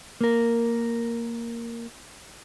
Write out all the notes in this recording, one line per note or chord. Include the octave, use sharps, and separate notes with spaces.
A#3 A#4